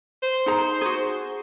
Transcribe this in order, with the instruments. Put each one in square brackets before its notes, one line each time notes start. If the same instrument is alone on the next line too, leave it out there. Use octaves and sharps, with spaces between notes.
[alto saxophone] C5
[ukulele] D#4 G#4 A#5
F#4 G#4